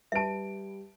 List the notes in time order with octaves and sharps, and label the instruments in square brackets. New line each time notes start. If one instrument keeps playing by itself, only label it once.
[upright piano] G3 B4 D7 [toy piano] E5 A5